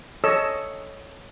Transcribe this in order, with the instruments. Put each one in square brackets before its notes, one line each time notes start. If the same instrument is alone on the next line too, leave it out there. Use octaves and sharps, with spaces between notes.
[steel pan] A4 C#5 D#5 E6